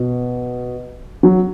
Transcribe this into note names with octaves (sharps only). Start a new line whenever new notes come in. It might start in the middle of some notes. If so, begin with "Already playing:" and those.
Already playing: B2
F#3